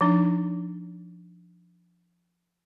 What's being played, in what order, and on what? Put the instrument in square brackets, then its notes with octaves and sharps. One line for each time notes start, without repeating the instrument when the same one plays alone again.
[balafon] F3 D4 D#4